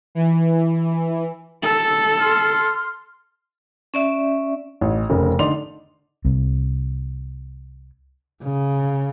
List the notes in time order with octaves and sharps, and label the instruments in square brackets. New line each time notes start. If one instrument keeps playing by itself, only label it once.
[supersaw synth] E3
[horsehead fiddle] A4
[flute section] C6 F6
[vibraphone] C#4 D5 E5
[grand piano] A1
F1 C#3 A#4
D3 D#4 D5 C6 F7
[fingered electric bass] C2 C3
[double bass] C#3